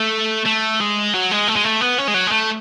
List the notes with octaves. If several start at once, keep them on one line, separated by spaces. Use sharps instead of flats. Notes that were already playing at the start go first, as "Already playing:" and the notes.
Already playing: A3
A3
G#3
F#3
G#3
A3
G#3
A3
B3
C#4
G#3
F#3
G#3
A3